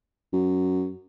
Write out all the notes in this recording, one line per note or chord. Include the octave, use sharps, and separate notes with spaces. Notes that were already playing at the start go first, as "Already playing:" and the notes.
F#2